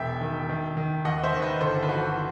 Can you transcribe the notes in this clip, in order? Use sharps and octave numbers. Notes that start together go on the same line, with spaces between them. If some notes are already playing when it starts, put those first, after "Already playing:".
Already playing: E1 B2 E5 G5
D#3
D#3
D#3
D#2 D#5 F#5
C5 E5
D#3
B4 D#5
G1 A4 C5
B4
E3 F#4 A4